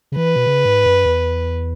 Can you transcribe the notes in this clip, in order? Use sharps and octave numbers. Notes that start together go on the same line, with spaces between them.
C#3
E3 B4
B2
C#3
G#2
F#2
E2